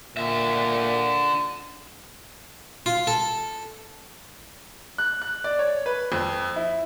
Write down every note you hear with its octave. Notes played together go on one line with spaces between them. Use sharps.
A#2 D3 E5
F4
A4
F#6
F#6
D5
C#5
B4
F2
E4